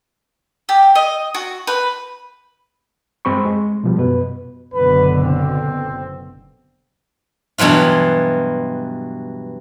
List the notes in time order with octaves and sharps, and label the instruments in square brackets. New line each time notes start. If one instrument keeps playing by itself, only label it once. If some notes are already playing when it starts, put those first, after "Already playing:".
[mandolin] G4
D#5
F#4
B4
[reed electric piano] G2 G#3 C4 B5 C#6
G#3
B2 F3 G3
F#2 B2 B4
[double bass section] F#1 B2 D3 [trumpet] B4
[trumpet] C4
[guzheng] G2 B2 E3 F#3 F4